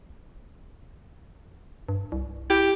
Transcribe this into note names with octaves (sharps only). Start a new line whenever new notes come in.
G2
C2
E4 G4